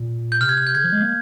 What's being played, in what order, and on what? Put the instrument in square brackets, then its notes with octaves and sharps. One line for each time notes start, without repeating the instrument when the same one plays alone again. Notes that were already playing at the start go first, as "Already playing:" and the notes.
Already playing: [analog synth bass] A#2
[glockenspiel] G6
[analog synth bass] C3 [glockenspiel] F6
[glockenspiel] G#6
F6
G6
[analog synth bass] C#3 [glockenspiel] G#6
[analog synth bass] F3
G#3
A#3